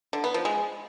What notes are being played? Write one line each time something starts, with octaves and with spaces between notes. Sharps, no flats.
D3
B3
F3
G#3